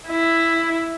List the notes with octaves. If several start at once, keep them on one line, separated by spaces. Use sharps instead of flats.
E4